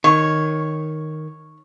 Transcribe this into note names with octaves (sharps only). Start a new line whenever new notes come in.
D#3 C#5